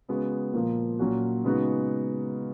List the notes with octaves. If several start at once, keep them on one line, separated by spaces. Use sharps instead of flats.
C#3 G#3 B3 F#4
A#2 F3 A#3
A#2 F#3 C#4 F#4
C#3 G#3 B3 D#4 F#4